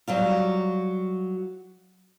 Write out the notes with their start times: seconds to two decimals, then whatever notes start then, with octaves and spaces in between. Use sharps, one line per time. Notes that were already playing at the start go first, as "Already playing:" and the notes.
0.08 F#3 G3 F4